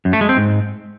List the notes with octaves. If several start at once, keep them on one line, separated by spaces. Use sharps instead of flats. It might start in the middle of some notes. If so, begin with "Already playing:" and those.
F#2
A3
G#3
C4
G#2